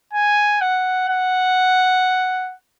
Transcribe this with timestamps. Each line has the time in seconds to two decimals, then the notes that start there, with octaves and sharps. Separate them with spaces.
0.13 G#5
0.61 F#5
1.09 F#5